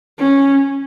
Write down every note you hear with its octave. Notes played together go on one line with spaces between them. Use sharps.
C#4